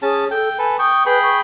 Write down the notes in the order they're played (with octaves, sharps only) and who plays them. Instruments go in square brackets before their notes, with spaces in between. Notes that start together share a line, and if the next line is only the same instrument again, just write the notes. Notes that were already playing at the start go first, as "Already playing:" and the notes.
[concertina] C#4 A5 [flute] G#4
[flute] A4 [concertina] G5
[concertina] A4 B4 [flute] G#5
[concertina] G5 C#6 [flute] D#6
[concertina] G#4 G5 B5 [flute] B4
[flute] C#6